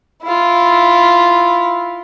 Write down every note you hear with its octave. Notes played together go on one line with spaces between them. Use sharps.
E4 F4